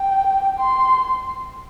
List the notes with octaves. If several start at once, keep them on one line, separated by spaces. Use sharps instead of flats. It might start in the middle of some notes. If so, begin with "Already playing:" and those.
Already playing: G5
C6